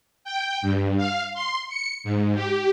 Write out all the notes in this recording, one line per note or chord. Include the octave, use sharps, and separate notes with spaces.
G5
G2
F5
C6
C#7
G#2
G4